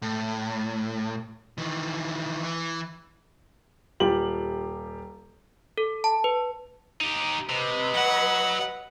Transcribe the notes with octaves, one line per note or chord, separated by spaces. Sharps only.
A2
D#3 E3
E3
D#1 F4 G4 F#7
A4
A5
B4
D#4 G4
C3 B4 D#5
F#3 F#5